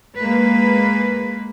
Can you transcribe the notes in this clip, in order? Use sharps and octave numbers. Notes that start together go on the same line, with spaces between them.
G#3 A#3 B4